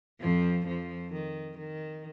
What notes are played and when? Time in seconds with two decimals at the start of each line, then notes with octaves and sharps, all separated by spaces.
0.20 F2 F3
0.66 F2 F3
1.12 D#3
1.58 D#3